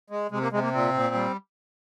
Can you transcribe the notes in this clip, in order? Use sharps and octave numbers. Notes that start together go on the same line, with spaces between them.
G#3
C3 G#3
A#3
C3 G#3
A#3
A#2 C4
A#2
G3